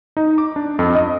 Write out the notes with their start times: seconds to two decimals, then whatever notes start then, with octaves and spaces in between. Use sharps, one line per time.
0.17 D#4
0.38 D6
0.56 D4
0.79 F2
0.95 D#5